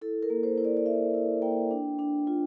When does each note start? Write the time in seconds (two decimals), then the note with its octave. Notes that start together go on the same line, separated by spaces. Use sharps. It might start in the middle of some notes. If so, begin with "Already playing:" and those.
0.01 E4 A4
0.23 A#4
0.30 A#3
0.43 C5
0.58 E4 C5
0.65 D5
0.77 D5
0.86 E4 E5
1.14 E4
1.42 A#3 G5
1.71 D4
1.99 D4
2.27 F4